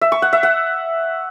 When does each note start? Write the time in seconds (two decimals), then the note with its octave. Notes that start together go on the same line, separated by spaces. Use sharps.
0.01 E5
0.12 C#6
0.22 F#5
0.33 E5
0.43 F#5